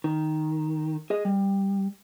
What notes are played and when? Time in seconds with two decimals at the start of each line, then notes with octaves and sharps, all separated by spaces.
0.04 D#3
1.10 G#4 D#5
1.25 G3